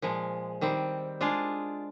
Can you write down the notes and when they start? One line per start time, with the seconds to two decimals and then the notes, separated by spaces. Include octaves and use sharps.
0.02 A#2 F3 G#3
0.61 D#3 G3 C4
1.21 G#3 D4 F4 G#4